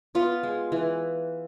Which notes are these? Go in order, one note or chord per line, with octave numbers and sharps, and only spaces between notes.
B3 F4
G#3
E3